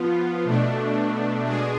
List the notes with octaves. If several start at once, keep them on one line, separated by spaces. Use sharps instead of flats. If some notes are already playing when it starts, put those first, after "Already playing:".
Already playing: F3 B3 F4
B2 A3 D4
B2 G#3 D4 G#4